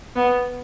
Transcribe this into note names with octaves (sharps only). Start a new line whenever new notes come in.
B3